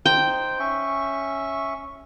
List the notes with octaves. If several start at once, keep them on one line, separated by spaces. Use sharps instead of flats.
D#4 C5 G5
C#4 E5 C#6